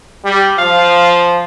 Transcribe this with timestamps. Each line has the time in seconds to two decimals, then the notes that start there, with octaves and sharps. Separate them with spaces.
0.25 G3
0.59 F3 F5